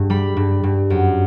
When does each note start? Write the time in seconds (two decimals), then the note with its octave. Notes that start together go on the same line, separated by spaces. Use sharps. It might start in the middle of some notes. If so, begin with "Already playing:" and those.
Already playing: G2
0.10 G3 B5
0.37 G2
0.63 G2
0.90 F#2